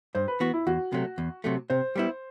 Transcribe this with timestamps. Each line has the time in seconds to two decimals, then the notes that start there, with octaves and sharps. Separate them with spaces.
0.15 G2 C5
0.28 B4
0.40 E3 B3 F#4
0.53 E4
0.67 E2 F#4
0.92 C3 F#3 A3
1.18 E2
1.44 C3 F#3 A3
1.70 C3 C5
1.96 G3 B3 E4